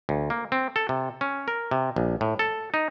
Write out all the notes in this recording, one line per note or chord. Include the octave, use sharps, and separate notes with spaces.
D2
A#3
C4
A4
C3
C#4
A#4
C3
A#1
A2
A4
D#4